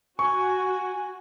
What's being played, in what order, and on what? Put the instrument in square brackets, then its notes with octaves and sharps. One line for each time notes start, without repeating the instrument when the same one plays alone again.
[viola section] F#4 [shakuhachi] G#5 [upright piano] C#6